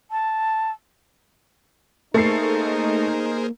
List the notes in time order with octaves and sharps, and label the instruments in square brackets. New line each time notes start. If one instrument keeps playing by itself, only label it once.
[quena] A5
[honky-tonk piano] A3 C7 [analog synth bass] A#3 [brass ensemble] D#4 [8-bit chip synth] G#4 A#4 C5